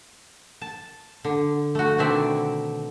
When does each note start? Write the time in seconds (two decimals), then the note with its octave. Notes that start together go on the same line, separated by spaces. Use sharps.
0.61 A5
1.24 D3
1.75 A3 F#4
1.98 B2 D3 D#3 C4 D5 E5